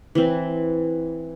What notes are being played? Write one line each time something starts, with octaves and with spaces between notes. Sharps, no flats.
E3 C4